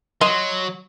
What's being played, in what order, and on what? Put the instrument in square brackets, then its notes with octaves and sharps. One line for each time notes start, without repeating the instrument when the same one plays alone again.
[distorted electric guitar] F#3 [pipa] D#5 C6